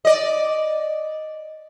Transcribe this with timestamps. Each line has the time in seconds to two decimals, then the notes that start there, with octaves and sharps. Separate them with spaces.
0.05 D5 D#5